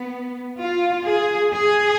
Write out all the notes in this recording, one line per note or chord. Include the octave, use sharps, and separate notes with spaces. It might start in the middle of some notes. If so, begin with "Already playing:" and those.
Already playing: B3
F4
G#4
G#4